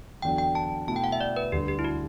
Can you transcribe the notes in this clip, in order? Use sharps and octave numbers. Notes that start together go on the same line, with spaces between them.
E2 D3 F#3 G5
G5
A5
B2 A3 E4 A5
G5
F#5
E5
D5
B4
D2 D3 G3 G4
G4
E4
F#4